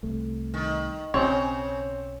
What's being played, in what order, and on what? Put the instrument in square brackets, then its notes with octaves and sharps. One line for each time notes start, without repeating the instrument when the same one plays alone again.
[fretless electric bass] C2 A3
[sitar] D#3
[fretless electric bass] B1 C#4 [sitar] C#3 [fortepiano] C4 C#5